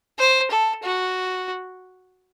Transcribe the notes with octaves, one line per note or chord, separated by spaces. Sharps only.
C5
A4
F#4